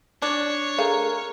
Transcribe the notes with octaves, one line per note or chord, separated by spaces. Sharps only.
D4 C#5
A3 G#4 A#4 F5